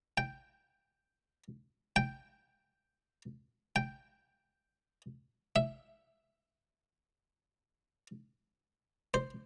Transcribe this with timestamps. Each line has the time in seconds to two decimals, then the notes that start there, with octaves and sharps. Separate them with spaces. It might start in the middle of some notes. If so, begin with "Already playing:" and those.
0.18 G5
1.96 G5
3.76 G5
5.56 E5
9.14 C5